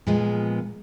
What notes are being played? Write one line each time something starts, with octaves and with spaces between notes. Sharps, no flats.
A#2 F3 G#3 B3